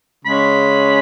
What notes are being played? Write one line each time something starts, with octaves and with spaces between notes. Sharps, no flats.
C#3 G#3 C#4 B5